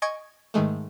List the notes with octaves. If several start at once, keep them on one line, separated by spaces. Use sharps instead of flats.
D#5 G#5 C#6 G#6 D7
G#2 D#3 G#3 A3